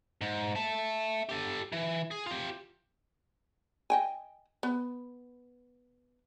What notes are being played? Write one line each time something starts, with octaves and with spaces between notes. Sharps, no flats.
G#2
E5 A5
G4 A4
E3
G#4
F4 G4
D#5 G5 G#5
B3